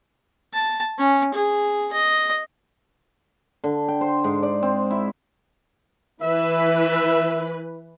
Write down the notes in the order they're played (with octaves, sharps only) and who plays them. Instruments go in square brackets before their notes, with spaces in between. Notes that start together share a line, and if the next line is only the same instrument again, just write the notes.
[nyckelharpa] A5
C#4
G#4
D#5
[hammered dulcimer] D3
G5
C5
G#2
D5
C4
E4
[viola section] E3 B4 [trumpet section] E5